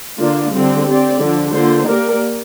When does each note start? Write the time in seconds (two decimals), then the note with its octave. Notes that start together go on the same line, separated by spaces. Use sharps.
0.19 D3 A#3 D4 F4
0.52 D3 G3 C4
0.86 C4 G4 D5
1.20 D3 F3 D4
1.54 D3 A#3 F4 C5
1.88 A#3 G4 A#4 D5